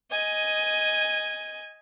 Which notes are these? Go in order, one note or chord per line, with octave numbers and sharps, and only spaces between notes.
D#5 G#5